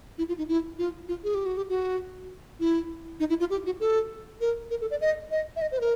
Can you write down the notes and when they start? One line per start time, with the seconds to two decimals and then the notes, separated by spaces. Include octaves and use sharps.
0.18 E4
0.28 F4
0.38 D#4
0.48 E4
0.78 F4
1.08 F4
1.24 G#4
1.35 G4
1.46 F#4
1.57 G4
1.69 F#4
2.60 E4
3.20 D#4
3.29 E4
3.40 F4
3.50 G4
3.66 F#4
3.80 A4
4.41 A#4
4.71 A#4
4.81 A4
4.91 D5
5.01 D#5
5.31 D#5
5.56 E5
5.62 D#5
5.72 C5
5.78 B4
5.81 A#4